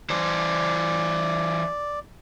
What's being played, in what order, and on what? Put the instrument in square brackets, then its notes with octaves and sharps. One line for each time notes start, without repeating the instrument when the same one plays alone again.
[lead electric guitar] E3 C5 [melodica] D5